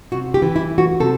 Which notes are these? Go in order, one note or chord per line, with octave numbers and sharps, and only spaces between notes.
C3 F#4
G4
E3
E4
A3
F#4
C3 A4